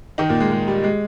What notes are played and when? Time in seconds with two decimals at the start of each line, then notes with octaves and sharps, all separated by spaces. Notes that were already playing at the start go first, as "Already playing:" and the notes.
0.18 D#3 D#4
0.29 A#2 A#3
0.40 G#3
0.52 G#3
0.68 G3
0.84 G#3